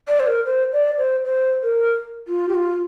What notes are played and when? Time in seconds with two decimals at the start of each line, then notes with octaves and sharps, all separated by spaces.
0.08 D5
0.20 C5
0.27 A#4
0.46 C5
0.73 D5
0.98 C5
1.24 C5
1.63 A#4
2.28 F4
2.49 G4
2.54 F4